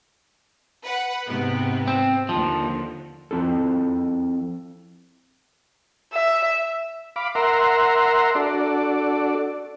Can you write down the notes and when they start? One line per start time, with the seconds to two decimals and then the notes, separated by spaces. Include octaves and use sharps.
0.83 B4 F#5
1.26 G#2 C3 B3
1.88 C4
2.29 D#2 D3 F3
3.31 F3 C4 E4 A4
6.13 E5
7.16 F5 B5 D6
7.35 A#4 E5 F#5 A#5 C6
8.35 D4 F#4 A4 D5